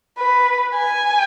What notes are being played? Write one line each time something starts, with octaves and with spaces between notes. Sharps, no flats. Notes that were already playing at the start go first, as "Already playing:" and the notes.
B4
G#5